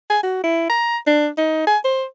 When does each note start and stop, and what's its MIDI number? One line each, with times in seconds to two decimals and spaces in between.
0.10 0.23 80
0.23 0.41 66
0.44 0.66 64
0.70 0.97 82
1.07 1.29 62
1.38 1.66 63
1.67 1.78 80
1.84 2.05 72